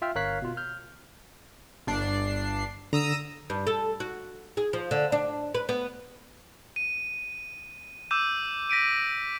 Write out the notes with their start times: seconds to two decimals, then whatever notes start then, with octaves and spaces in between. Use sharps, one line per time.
0.02 F4 E5 G5 F6
0.15 G1 A#4 C#5 F5 F#6 B6
0.42 B2 F4
0.57 F6 G6
1.87 G1 D4 C7
2.93 D3 A#5 D#6 E6
3.50 G2
3.67 A4
4.00 F#4
4.57 G#4
4.73 F3
4.91 D3
5.12 D4
5.54 B4
5.69 B3
6.76 D#7
8.11 D6 E6 G6 D#7
8.70 A#6 B6 D7 D#7